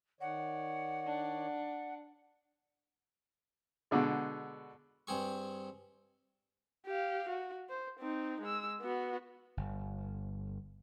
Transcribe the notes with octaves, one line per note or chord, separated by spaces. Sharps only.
D#3 C#5 D5 F#5
D4
B2 D3 G#3
G2 C4 G#4 C#6
G4 F5
F#4
C5
C4 D#4
G#3 E6
B3 F#4
G1